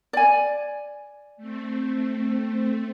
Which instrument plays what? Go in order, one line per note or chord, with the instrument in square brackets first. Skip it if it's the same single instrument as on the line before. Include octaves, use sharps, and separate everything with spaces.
[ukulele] D5 G#5
[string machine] A3 C4